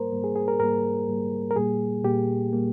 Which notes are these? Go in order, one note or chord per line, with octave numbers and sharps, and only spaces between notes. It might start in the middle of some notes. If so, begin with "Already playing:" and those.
Already playing: G#2 G3 A#3 A#4 C5
G#2 G3 A#3
G#4
G#4
A#4
G#2 G3 A#3 A#4
G#2 G3 A#3
A#4
A#2 G3 A#3 G#4
A#2 G3 A#3 G4
A#2 G3 A#3